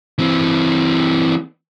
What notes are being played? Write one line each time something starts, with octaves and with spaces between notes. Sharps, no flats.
E3 C4